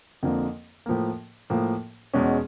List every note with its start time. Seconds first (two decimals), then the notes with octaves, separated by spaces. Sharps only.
0.23 F2 D3 F3 A#3
0.86 A2 F3 A#3
1.50 A2 F3 A#3
2.14 E2 B2 G#3 C#4